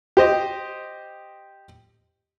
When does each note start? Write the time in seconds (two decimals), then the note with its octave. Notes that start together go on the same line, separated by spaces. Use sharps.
0.17 G4 C5 D#5